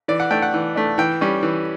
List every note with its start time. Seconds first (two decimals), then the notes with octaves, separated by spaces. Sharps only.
0.08 E3 D5
0.20 F#5
0.31 A3 D4 G5
0.42 F#5
0.54 E3
0.76 A3 D4
0.98 E3 G5
1.21 G3 C#4
1.43 E3